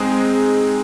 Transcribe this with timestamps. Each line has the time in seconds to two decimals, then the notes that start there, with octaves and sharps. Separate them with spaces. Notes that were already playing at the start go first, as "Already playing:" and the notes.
Already playing: G#3 C4 D#4 G#4